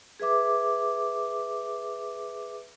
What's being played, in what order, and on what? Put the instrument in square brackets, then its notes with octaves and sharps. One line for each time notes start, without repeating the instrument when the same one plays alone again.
[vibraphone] G#4 B4 E5 D6